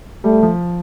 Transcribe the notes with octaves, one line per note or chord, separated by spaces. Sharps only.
G3 A3
F3